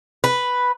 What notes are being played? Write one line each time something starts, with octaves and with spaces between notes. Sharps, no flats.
B4